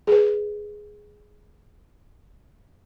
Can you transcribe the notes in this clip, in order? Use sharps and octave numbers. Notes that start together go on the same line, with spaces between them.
G#4 B4